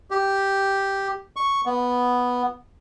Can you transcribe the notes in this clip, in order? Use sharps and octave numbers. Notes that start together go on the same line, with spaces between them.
G4
C#6
B3